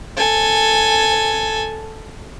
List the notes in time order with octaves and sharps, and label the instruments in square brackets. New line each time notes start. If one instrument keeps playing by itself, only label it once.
[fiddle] A4 G#5